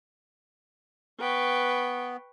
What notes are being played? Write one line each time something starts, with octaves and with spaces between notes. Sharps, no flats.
B3 B4 G5 C#6